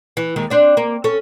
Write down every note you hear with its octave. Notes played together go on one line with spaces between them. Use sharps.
E3
D#2 D#3 G#3
C4 D4 D5
A#3
C#4 A4